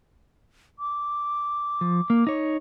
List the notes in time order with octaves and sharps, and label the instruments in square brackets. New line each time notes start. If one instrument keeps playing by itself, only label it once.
[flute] D6
[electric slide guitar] F3
A#3
D#4 C#5